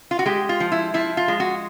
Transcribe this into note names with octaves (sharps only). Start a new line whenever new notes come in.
F4
F#4
G#3 G4
F4
F3
E4
F3 E4
F4
G#3
F#4